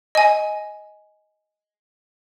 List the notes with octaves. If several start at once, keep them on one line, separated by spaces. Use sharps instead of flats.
D#5 G#5